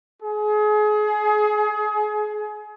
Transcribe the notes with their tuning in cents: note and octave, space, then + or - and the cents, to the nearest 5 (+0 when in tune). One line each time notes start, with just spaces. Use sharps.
G#4 +30